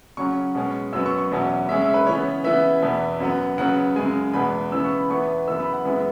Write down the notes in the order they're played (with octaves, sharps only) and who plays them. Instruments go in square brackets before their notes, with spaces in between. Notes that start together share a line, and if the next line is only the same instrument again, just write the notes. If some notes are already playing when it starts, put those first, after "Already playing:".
[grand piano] C#3 F#3 C#4 C#6
B2 G#3 C#4
F#2 F#3 B3 E6
C#6
C#6
E2 B2 F#3 C#4
C#3 G#3 C#4 E5
E5
B4
C#3 E3 B3 C#5
C#3 E3 B3 E5
E2 B2 B3
F#2 F#3 B3
C#3 F#3 B3 F#5
F#2 C#3 G#3 G#5
E2 B2 G#3 B3 B5
C#3 E3 B3 E6
C#6
B5
E2 E3 B3 C#6
F#2 C#3 E3 B3 E6
B5
F#5
F#2 E3 G#3 B3 E5